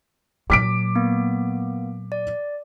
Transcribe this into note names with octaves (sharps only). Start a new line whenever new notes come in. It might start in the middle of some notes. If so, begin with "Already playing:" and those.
A#2 F#3 D6 B6 D7
A#3 B3
D5